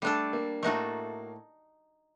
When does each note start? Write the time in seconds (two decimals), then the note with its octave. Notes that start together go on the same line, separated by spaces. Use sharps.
0.02 G3 A3 D4 A4
0.33 A#3
0.63 A2 A3 A#3 D#4 F#4 A4